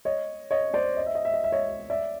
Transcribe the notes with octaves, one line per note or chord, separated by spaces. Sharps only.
C#5 D#5
C#5 D#5
C5 D5
D#5
E5
D#5
E5
D#5
E5
C#5 D#5
D5 E5